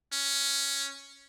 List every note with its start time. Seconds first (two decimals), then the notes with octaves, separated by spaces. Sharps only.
0.13 C#4